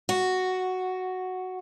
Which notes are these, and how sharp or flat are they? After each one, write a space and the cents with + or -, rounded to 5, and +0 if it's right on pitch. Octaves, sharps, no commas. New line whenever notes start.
F#4 +0